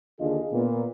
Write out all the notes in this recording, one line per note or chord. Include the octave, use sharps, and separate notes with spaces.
D#2 D3 D4 F4 G#4 D#5
A#2 B3